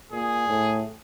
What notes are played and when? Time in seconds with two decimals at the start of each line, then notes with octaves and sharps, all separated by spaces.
0.12 A#2 G#4
0.49 A2